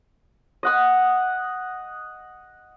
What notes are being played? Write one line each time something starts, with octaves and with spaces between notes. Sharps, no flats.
D#5 F#5 D#6